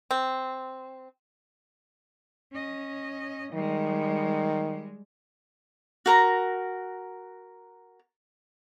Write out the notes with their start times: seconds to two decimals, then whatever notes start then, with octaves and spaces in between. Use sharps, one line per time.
0.11 C4
2.52 C#4 D#5
3.54 D#3 G3 G#3
6.06 F#4 A#4 A#5